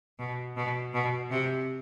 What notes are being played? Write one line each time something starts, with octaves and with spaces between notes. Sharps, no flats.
B2
B2
B2
C3